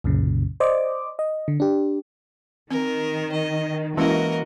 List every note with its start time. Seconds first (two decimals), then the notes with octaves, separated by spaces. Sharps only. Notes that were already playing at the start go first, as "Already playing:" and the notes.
0.04 C2 F#2 A#2 C#3
0.60 C5 D5 D#5 D6
1.19 D#5
1.48 D3
1.60 D4 G4
2.71 D#3 C4 A#4
3.32 D#5
3.97 E3 G#3 A#3 C#4 E4 F#4 A#4 D#5